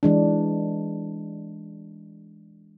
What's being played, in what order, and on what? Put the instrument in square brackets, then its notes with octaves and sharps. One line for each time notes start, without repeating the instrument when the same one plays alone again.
[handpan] E3 G#3 D4